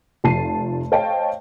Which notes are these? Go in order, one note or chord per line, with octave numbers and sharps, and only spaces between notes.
F1 F3 A5 C7 D#7
C5 C#5 D#5 F5 G5 A5